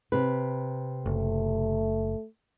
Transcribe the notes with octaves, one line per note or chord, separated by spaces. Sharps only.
C3 B4
F#1 A3